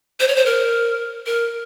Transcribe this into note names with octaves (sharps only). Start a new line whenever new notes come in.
C5
C#5
C5
A#4
A#4